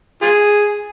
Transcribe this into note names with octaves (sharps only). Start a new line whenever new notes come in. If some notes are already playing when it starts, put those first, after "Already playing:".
F4 G#4